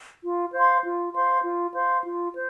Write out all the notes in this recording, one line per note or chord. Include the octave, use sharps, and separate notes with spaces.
F4
C5 F5 C6
F4
C5 F5 C6
F4
C5 F5 C6
F4
C5